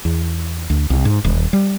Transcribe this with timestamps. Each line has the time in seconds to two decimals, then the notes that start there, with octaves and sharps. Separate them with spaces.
0.05 E2
0.70 D2
0.90 C2
1.05 G#2
1.24 D#1
1.53 G3